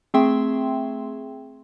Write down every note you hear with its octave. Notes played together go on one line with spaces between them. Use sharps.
A3 C4 G#4 E5 G5 C6